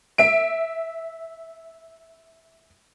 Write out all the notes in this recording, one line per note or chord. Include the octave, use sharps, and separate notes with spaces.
E5 D7